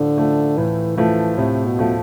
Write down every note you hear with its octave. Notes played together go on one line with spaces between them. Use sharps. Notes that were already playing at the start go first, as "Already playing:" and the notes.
Already playing: A2 D3 F3 A3
F3 A3
A2 E3
E3 F3 A3
A2 C3
B2
F3 A3